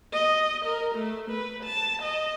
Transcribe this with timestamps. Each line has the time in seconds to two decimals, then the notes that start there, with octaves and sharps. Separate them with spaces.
0.13 D#5
0.66 A#4
0.96 A3
1.31 B4
1.64 A5
2.03 D#5